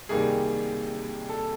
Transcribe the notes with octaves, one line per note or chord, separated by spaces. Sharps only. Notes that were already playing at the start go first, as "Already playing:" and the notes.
C2 C3 D#3 G3 A#3 G#4
A4